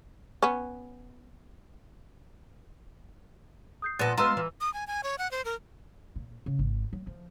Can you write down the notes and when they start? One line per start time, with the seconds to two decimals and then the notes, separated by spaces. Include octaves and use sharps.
0.43 B3 C#4
3.82 D#6 G6 C7
3.99 A#2 F3 B3 A4 B4 A6 A#6
4.17 G#3 B3 F4 A5 A#5 C6 E6 F6
4.37 E3
4.61 D#6
4.74 G#5
4.87 G#5
5.04 C#5
5.18 F#5
5.31 C5
5.45 A#4
6.16 A#2
6.46 C#3
6.59 G#1
6.93 F#3
7.07 F3